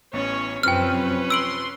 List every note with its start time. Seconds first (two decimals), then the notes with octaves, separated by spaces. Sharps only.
0.13 A1 B3 C#4 C#5 A6
0.63 F#2 C3 F3 C4 C#4 B4 G5 F6
1.30 C6 E6 D7 F#7